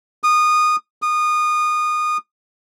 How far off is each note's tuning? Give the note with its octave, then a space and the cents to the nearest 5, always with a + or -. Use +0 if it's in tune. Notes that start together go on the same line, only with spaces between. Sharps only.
D#6 -20
D#6 -25